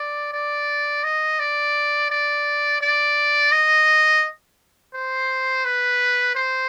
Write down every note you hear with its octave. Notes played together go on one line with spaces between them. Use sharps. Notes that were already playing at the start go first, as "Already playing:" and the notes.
Already playing: D5
D5
D#5
D5
D5
D5
D#5
C5
B4
C5